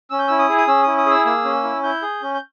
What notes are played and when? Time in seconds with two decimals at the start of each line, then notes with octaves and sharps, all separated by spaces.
0.10 C#4 E6
0.19 G6
0.28 E4 E6
0.39 D#6
0.49 G#4
0.57 D#6
0.68 C#4 E6
0.83 E4 D#6
0.98 D#6
1.06 G#4 E6
1.26 A#3 E6
1.44 C#4
1.64 E4
1.83 E4 G6
2.02 G#4
2.22 C#4
2.34 G6